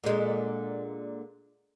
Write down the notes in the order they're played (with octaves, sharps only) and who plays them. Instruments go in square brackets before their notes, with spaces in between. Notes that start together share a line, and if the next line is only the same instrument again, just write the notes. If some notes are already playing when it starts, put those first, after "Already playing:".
[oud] A#2 D3 G#3